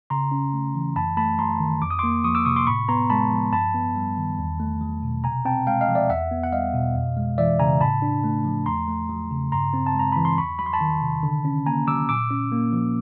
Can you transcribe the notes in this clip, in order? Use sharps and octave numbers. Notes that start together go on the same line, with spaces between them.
C#3 A#5 C6
C#4
A3
E3
F#2 A5 B5
A3 A5 B5
F#3 A#5 C6
D#3
F2 D6
D#6
A#3 C6 D6
F3 C#6 D#6
D6 E6
C3 C#6 D#6
C6 D6
A2 B5 C#6
B3 A#5 C6
G#3 A5 B5
F3
G2 A5 B5
B3
G3
D#3
E2
A3
F#3
B2
C3 G#5 A#5
C4 G5 A5
G#3 F5 G5
D#5 F5
F3
D5 E5
E2 E5 F#5
B3
F#5
G3 D#5 F5
B2
F2
G#3
E3 D5 E5
C#3 G#5 A#5
A2 A5 B5
D4
A3
F3
E2 A#5 C6
A3
F#3
C#3
G2 A#5 C6
C4
A5
G#3 A#5
E3 B5
C6
E2 B5 C#6
F#3 B5
C6
A5 B5
D#3
C3
D3
C#4
A#3 G#5 A#5
F#3 D6 E6
A#2 D6 E6
C#4
A#3
F3